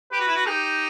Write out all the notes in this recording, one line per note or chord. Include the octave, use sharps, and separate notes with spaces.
G4 B4
F#4
E4
F#4
D#4 G4